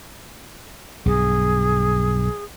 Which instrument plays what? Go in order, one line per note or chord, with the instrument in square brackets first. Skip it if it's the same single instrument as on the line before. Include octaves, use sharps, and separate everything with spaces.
[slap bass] B1 G2 [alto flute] G#4